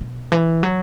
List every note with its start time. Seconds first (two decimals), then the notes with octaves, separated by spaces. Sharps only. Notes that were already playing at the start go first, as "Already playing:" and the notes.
0.01 B2
0.32 E3
0.63 F#3